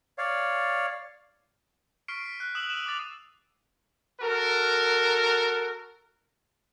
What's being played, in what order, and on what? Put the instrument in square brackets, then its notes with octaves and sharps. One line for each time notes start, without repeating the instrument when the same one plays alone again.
[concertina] C#5 D5 F5
[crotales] C#6 F6 B6 C7 D7
B6
F#6
D#6 E6 F#6 E7 F#7
E6 D#7 E7
D6 D#6 A6 F7
[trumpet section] F#4 A4 A#4